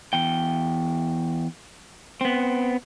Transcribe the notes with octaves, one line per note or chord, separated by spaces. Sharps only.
E2 G5
B3 C4